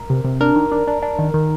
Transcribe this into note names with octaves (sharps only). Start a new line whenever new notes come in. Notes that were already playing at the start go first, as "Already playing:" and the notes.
Already playing: A#4
C3
C3
D4 A#4
D#3
D4
D4
D4
D#3
D#3